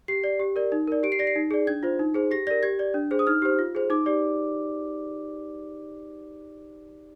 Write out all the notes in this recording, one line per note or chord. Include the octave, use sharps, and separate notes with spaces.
G4 C7
D5
G4
A#4 D5
D#4
A#4 D5
G4 D7
C7
D5 A#6
C7
D#4
G#4 D5
D4 G#6
F4 C5
D#4
G#4 C5
G4 A#6
A#4 D5 A#6
G4 G#6
D5
D4
G#4 C5
D#6
D#4 F6
G4 C5
F4
G#4 C5
D#4 D6
G4 D5